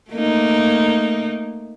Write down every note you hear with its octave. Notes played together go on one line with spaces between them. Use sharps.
A3 A#3 D#4